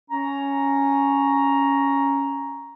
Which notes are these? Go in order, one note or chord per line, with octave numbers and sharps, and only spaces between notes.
C#4 A#5